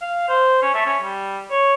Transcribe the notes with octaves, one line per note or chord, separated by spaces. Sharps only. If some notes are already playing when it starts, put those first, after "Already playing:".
F5
C5
C#4
A3
C#4
G3
C#5